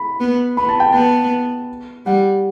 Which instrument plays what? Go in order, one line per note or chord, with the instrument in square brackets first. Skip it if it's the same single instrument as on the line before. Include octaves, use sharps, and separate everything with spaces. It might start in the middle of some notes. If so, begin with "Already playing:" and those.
Already playing: [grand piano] B5
[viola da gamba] B3
[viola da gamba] B3 [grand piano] B5
[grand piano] A5
G5
[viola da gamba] B3 [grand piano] A5
[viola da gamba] G3 [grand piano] F#5